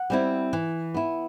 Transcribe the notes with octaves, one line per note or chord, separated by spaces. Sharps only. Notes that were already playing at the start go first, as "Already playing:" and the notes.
Already playing: F#5
G3 C4 E4
E3
B3 E4